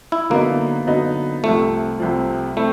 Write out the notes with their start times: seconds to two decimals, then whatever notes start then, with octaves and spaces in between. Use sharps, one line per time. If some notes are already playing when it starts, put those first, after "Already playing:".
0.12 E4
0.30 D3 F#3 A#3 B3 D#4
0.87 D3 F#3 B3 D#4
1.44 C2 C3 F3 A3
2.00 C2 C3 F3
2.57 A3 C4 E4